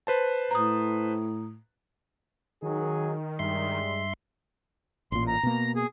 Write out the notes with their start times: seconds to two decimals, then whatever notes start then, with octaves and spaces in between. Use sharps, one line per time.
0.07 B4 C5 A5
0.51 A2 A#5 D#6
2.62 D#3 F#3 D#4 G#4
3.39 G2 G3 G#3 E5 C6
5.12 A1 A#2 C6
5.27 A#5
5.43 B2 A#3
5.76 G#4